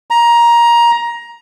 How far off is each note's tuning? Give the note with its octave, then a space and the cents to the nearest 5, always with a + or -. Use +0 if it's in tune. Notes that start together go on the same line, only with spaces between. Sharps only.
A#5 +15